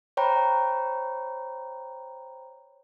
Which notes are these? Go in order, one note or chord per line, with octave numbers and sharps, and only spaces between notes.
C5 C#5 G5 A#5 B5